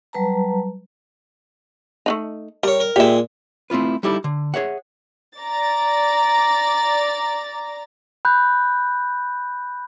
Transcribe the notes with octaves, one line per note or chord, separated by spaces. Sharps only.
F#3 G3 B4 A5 A#5
A3 D4 D#4
G3 A#4 C#5
A#4
A#2 G#3 G4 E5
A3 C4 E4 F4 B4
G3 D#4 E4 G4 A4
D3
G#4 C#5 E5 F#5
D5 A#5 A6
B5 F#6 G6